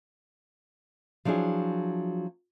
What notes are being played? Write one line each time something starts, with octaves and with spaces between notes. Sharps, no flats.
F3 F#3 D4 E4 G#4